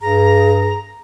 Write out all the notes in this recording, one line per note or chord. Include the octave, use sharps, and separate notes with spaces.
G2 G#4 A#5